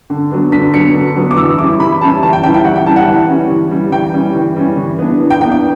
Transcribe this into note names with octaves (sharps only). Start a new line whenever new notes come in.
D3
F#3 B3 D4
D3 B6
F#3 B3 D4 C#7
D3
F#3 B3 D4
D6
E3 E6
G3 C#4 E4 D6
E3 B5
G3 C#4 E4 A5
E3 A5
G5
G3 C#4 E4 G5
G5
E3 F#5
G5
G3 C#4 E4 A5
F#5
E3
G3 C#4
E3
G3 C#4
E3 G5
G3 C#4
E3
G3 C#4
E3
B3 D4
E3
G5
B3 D4 G5
G5